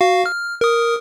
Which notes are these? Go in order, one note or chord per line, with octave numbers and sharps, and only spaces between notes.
F#4 F5
F6
A#4 D#6